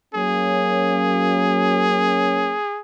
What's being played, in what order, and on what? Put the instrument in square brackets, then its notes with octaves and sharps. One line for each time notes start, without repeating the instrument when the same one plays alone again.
[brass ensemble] F#3 A#3 C#4 [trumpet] G#4